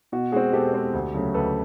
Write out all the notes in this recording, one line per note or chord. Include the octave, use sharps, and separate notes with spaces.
B2 F#4
G#3 C4 F#4 G#4
B2 G4 A4
G#3 C4
D2
C#3 F#3 A3
D2 A4 B4